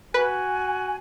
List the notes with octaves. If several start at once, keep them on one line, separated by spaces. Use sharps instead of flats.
F#4 B4 G#5